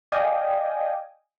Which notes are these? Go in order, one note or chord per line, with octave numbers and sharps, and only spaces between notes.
D5 D#5 F5 G5 G#5 D#6